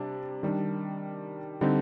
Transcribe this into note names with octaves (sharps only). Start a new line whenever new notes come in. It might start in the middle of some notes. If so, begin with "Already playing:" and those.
Already playing: C3 G3 D4
D#3 G3 D4
D3 G3 C4 D#4